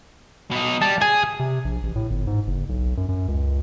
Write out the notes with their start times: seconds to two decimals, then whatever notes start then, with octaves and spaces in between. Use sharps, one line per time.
0.52 B2 D#4
0.82 G3 A5
1.02 G#4 G#5
1.40 C3
1.65 A#1
1.83 A1
1.96 A2
2.10 G1
2.27 G#2
2.47 F#1
2.69 B1
2.97 F#2
3.09 F#2
3.28 C#2